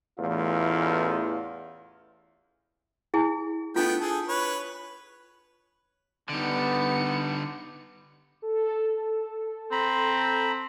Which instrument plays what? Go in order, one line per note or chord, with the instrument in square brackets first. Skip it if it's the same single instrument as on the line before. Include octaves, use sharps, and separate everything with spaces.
[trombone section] A1 E2 A3 F4
[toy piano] E4 G#4 G#5
[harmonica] A3 B3 G5 [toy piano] D4 F4
[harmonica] G#4 A4
B4 C#5
[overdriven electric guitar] D3 G3 [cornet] B3 [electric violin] D#4 C#7
[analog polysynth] A4
[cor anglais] C4 [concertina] A#5 B5